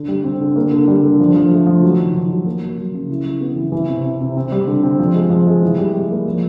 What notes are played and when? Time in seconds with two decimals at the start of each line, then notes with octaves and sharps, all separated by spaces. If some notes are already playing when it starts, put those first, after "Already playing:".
Already playing: D3
0.08 G3
0.24 C4
0.41 D3
0.56 A#3
0.72 D3
0.88 G3
1.03 D3
1.20 F3
1.36 F3
1.51 A3
1.67 F3
1.82 F#3
1.99 D#3
2.15 D#3
2.29 F#3
2.45 A#3
2.62 F#3
2.78 F#3
2.94 C#3
3.09 E4
3.26 E4
3.41 B3
3.56 E3
3.72 E3
3.88 C3
4.04 C3
4.21 C3
4.36 C4
4.52 G3
4.67 D3
4.83 C4
4.99 F3
5.15 G#3
5.30 F3
5.47 G#3
5.62 E3
5.78 G3
5.94 G3
6.10 A#3
6.26 F3